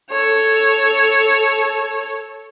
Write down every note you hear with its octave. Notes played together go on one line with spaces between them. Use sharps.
A4 C#5